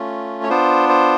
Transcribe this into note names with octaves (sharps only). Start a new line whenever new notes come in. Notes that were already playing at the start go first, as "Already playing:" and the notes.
Already playing: A3 C#4 F4
C#5
B3 D4 F4 C5
C5